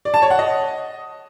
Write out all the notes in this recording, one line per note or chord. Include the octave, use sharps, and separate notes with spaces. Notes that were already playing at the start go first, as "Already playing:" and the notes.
D5
A5
C#5
F#5
D#5